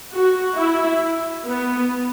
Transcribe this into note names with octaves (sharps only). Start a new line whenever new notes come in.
F#4
E4
B3